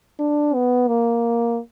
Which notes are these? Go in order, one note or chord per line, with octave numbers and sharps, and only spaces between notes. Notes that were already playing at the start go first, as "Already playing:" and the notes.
D4
B3
A#3